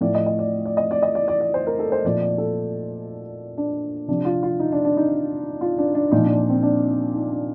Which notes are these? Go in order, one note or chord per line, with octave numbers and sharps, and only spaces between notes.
A2 F3 D5
D#5
D#5
D5
D5
D#5
D5
D#5
D5
D5
D5
C5
A#4
A4
C5
A#2 F3 D5
D5
A4
D4
C3 F3 D4
F4
F4
D#4
D4
D4
D#4
F4
D4
D4
A#2 F3 D#4
D4
C4
D4
D#4
D4